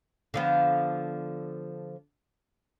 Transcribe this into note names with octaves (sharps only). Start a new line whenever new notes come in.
D3 F3 B3